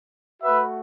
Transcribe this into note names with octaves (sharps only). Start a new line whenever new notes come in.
A3 F#4 B4 E5